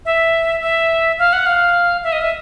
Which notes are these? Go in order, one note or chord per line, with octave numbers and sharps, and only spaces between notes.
E5
E5
F5
F#5
F5
E5
D#5
E5